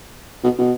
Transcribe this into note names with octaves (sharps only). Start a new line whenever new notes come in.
B2
B2